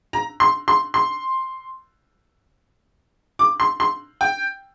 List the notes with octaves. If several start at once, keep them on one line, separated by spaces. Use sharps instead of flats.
A#5
C6
C6
C6
D6
C6
C6
G5